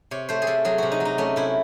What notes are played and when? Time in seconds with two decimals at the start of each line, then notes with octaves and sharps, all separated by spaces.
0.11 C3 C#5
0.29 A3 C5
0.42 G#4
0.47 C3 A4
0.65 F#3 G#4
0.78 C3 F#4
0.92 D#4
1.00 F#3
1.05 D#4
1.18 A3 C#4
1.36 C3 E4